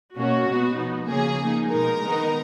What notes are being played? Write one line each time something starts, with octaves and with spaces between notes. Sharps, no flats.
B2 A#3 C#4 F#4
B2 G#3 B3
F3 B3 D#4
C#3 F3 A#3 C#4 G#4
F3 A#3 D#4
B2 G#3 D#4 A#4
D#3 G#3 B3 D#4